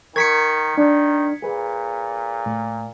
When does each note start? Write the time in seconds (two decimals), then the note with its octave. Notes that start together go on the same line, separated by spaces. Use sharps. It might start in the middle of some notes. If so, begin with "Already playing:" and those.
0.16 D#3 A#4 C#6 G#6 B6 C#7
0.78 D#3 D4
1.42 A#2 G#4 B4
2.46 A2